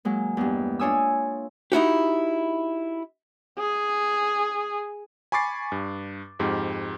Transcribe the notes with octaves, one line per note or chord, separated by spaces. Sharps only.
F#3 G#3 A#3
E2 G2
D4 F4 C#5 G#5 D#6 E6
D#4 E4 F#4 G4
G#4
G#5 B5 C#6 D6 A6 C7
G2
F2 G#2 G4